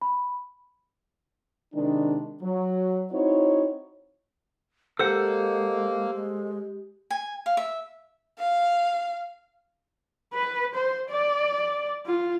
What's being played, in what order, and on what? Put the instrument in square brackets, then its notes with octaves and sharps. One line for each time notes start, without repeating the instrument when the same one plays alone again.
[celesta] B5
[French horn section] C3 D#3 G#3 D4
F#3
C4 D#4 E4 F#4 C#5
[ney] G#3 [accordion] A#3 [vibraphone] G4 [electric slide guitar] A4 C5 F#5
[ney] G#3
[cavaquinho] G#5
F5
E5
[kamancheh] F5
[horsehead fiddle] B4
C5
D5
F4